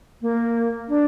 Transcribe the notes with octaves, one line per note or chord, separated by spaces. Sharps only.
A#3
D4